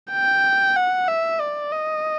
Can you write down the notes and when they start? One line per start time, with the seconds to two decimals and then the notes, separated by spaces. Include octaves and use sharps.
0.12 G5
0.77 F#5
1.09 E5
1.41 D5
1.73 D#5